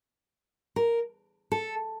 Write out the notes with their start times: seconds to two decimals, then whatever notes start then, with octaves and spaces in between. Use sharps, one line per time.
0.76 A#4
1.52 A4